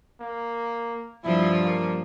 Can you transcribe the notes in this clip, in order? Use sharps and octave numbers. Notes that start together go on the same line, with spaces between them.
A#3
G2 F3 E4
A#3